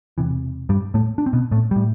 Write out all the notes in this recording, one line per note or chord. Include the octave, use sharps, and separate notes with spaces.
E1 D2 C3 E3
G2 G3
A2 A3
D4
C4
B2 B3
A2 A3
A2 G3